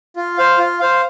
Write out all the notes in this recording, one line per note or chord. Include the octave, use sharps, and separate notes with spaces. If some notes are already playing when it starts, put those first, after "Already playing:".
F4
C5 F5
F4
C5 F5